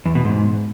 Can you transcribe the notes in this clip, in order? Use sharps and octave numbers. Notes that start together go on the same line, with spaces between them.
E2
B2
G#2